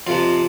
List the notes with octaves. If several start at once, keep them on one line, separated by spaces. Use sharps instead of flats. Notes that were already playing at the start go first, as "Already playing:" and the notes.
F2 C3 F3 F4